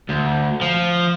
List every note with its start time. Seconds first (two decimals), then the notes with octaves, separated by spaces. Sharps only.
0.09 D2
0.61 F3